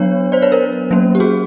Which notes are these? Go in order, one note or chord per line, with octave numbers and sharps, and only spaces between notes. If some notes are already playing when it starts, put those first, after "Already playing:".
Already playing: F#3 B3 D4 C#5
C5 D5
B4 C#5
A#4 C5
F#3 A#3 C#4
G4
F#4 G#4